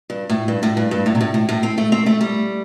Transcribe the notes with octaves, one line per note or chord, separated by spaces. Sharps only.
G2
A2
G2
A2
G2
G2
A2
C3
A2
A2
A2
C4
A3
C4
A3
G3